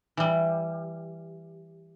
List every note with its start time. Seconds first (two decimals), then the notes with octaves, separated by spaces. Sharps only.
0.17 E3 G3